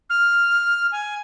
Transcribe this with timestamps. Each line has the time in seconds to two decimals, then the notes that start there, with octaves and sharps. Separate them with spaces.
0.10 F6
0.92 G#5